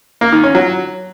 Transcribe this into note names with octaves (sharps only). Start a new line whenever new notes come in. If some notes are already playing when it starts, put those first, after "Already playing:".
A#3
D#3
C#4
F#3